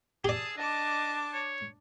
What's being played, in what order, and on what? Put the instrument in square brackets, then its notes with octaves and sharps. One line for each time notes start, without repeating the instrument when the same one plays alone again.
[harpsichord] G4 D5 [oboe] G#4 [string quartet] A5 D#6 E6
[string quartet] D4 D6 [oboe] D#5 [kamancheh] A5
[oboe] C#5